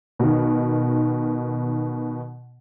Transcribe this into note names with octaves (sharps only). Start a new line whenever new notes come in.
B2 D#3